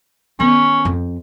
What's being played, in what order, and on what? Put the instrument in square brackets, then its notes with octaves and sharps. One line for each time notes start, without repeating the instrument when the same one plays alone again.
[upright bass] D#3 B3 [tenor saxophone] C#4
[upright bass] F2